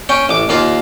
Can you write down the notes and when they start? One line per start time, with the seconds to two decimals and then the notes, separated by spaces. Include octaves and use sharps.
0.09 C#4 G5
0.29 A1 D6
0.49 D#2 A#3 F4